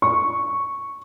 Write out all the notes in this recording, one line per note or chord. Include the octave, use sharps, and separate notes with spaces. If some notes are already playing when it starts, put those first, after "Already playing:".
C#6